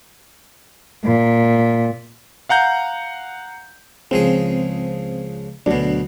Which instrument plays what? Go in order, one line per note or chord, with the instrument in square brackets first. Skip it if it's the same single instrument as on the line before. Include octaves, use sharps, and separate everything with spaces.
[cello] A#2
[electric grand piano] F5 F#5 A#5 G6
[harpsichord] C#2 F3 G#4 [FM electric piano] C4
[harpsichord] D2 B2 [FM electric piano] F#3 D4